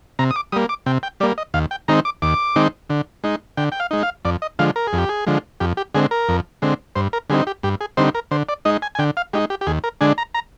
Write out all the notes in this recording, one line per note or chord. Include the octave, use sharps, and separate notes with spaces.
C3 A#5
D#6
D6
G3 A#3 D#6
D6
C3 G5
G5
G3 A#3 D5
D#5
D#2 F5
G5
D#3 G#3 C4 D#4 A#5
D6
D#2 D6
D#3 G#3 C4 D#4
D3
G#3 D#4
D3 G5
G5
F5
G#3 D#4
F5
F2 D5
D#5
D3 F3 G#3 F5
A#4
G#4
F2
G4
G#4
D3 F3 G#3
F2 G4
G4
D3 G#3 C4 G#4
A#4
F2
D3 G#3 C4
G2 C5
A#4
D3 G3 C4 D#4 G#4
G4
G2 G4
G#4
D3 G3 C4 D#4 C5
A#4
D3 C5
D5
G#3 D#4 D#5
G#5
G#5
D3 G5
F5
G#3 D#4 G4
G4
G4
D#2 G#4
A#4
D3 G#3 D4 G#5
A#5
A#5